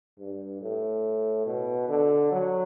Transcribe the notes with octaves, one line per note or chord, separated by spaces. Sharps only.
G2
A2
B2
D3
F#3